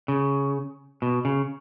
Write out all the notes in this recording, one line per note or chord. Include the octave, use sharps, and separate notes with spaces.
C#3
B2
C#3